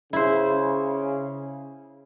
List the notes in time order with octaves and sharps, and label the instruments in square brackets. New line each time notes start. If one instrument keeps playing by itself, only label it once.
[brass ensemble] C#3 [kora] E4 C5